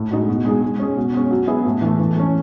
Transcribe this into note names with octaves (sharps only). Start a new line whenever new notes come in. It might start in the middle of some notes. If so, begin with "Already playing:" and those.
Already playing: A2
G#3 D#4 F#4
B2
G#3 D#4 G#4
G#3
C#4 G#4
B2
G#3 C#4
F#3
B3 E4 G#4
A2
E3 A3
E3
A3 C#4